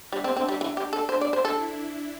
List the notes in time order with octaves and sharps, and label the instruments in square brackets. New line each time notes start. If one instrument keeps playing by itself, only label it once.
[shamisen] G3 [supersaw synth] D4
[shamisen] C4
C4
G3
E3
G4
A4
[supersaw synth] D4 [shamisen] C5
[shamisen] D5
C5
A4
[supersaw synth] E4